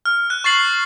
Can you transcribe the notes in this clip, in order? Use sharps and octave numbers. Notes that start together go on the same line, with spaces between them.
F6
F#6
C#6 A6 C7 F#7